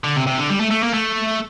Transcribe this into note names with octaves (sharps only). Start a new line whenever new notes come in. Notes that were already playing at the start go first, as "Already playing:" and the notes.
D3
C3
C3
D3
G3
A3
A3
A#3
A3